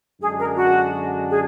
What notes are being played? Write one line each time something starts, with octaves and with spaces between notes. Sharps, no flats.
F#2 D3 G#3 D4 G#4
A#4
F#4
G#4